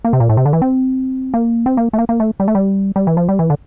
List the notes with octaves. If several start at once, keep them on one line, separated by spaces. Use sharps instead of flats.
A#3
C3
A#2
A2
C3
D3
E3
C4
A#3
C4
A#3
A3
A#3
A#3
A3
G3
A3
G3
G3
E3
F3
G3
E3
D3